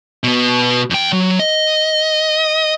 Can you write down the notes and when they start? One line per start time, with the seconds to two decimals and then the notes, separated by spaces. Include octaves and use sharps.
0.24 B2 B3
0.90 F2 G5
1.13 F#3
1.39 D#5